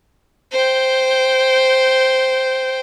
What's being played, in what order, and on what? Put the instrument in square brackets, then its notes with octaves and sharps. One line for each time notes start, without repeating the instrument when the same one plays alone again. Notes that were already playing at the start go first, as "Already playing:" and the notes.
[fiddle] C5 G5